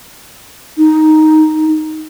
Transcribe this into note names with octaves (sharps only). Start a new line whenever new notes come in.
D#4